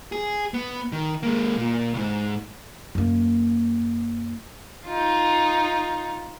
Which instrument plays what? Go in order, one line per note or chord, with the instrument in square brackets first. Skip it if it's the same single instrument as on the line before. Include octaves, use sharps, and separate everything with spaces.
[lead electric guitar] G#4
B3
D#3
G#3 A#3
A#2
C#2 G#2
[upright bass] F#2 A#3
[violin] D#4 F4